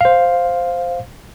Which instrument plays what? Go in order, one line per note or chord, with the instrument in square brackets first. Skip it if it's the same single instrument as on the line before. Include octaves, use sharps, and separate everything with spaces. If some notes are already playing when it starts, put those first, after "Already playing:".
[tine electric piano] C5 F5